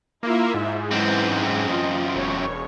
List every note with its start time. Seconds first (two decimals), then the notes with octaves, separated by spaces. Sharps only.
0.23 A#3 E4 F4 E5
0.54 G#2
0.91 F#2 E3 C4
1.66 F4 D#5
2.15 E1 C#5